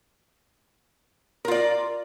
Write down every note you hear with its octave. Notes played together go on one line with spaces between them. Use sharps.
F4 A#4 D5